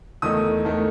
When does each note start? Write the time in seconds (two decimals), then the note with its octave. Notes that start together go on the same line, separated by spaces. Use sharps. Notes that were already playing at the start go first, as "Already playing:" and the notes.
0.22 E2 D#3 A3 D#4 D#6
0.65 E2 D#3 A3 D#4